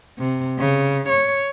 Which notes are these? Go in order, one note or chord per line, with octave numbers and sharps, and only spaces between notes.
C3
C#3
C#5